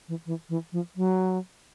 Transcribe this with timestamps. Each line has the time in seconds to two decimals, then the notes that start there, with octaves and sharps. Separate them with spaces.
0.08 E3
0.26 E3
0.49 E3
0.72 F3
0.96 F#3